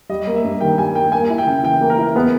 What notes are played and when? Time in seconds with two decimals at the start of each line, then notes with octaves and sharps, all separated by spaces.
0.09 G3 D#5
0.27 A#3
0.36 E5
0.44 G2
0.61 D#3 G5
0.78 G3 G#5
0.95 A#3 G5
1.12 A#3 G#5
1.30 E4
1.38 G5
1.46 C#3
1.63 E3 G5
1.81 A#3
1.90 A#4
1.98 E4
2.15 B3 G#4